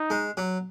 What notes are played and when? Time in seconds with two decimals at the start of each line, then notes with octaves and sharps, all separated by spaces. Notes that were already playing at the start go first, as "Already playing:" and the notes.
Already playing: D#4
0.10 G#3
0.37 F#3